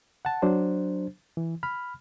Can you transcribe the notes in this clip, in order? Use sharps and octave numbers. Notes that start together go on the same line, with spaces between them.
F#5 A5
F#3 D4 C5
E3
B5 F6